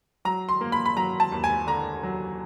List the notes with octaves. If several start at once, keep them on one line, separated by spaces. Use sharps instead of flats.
F#3 A#5
C6
A#3
B5
B5
F#3 A#5
A5
D#2
G#5
D3 A#5
F#3